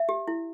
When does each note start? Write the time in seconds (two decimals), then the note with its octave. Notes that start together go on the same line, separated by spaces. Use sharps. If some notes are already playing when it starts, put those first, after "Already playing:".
Already playing: E5
0.09 G4
0.28 E4